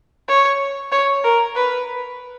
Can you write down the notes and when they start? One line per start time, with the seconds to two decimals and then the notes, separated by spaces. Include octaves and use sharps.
0.28 C#5
0.91 C#5
1.24 A#4
1.55 B4